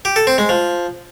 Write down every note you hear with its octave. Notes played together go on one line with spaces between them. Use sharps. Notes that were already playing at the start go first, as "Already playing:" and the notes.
G4
A4
C4
G#3
F3